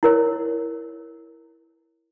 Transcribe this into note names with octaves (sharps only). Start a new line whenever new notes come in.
E4 A#4 C#5